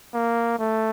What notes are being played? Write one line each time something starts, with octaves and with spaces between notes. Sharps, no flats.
A#3
A3